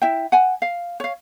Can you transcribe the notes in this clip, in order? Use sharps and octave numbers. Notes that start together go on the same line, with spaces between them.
E4 E5 G5
F#5 G#5
F5
C#5 F5